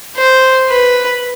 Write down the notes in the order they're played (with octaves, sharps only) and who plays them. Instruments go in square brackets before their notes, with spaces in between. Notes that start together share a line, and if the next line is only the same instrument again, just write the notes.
[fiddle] C5
B4